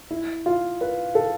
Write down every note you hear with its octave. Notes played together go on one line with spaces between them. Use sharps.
E4
F4
B4
A4